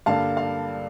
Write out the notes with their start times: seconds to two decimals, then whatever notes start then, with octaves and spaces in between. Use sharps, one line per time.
0.06 G2 D3 G3 A#3 F5 A5
0.37 F5